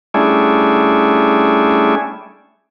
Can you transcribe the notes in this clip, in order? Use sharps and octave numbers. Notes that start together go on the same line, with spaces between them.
G3 A3 C#4 D4 E4 G#4